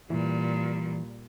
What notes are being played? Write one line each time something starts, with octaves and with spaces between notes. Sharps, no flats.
A#2 E3 G3